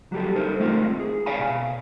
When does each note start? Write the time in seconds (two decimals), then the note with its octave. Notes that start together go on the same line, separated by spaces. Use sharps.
0.12 F#3 G3 G4 A4
0.35 D#4 A4 A#4 C5
0.60 G#3 A3 C4 D#4 F4 A#4
1.00 G#4
1.26 C#5 D5 E5 F5 G#5 B5
1.39 B2 F5